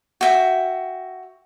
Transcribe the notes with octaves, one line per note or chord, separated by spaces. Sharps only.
F#4 E5 G5